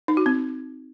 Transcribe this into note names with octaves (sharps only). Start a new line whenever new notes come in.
D#4
F#4
C4